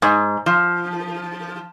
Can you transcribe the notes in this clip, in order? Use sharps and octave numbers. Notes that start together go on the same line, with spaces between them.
G#2
F3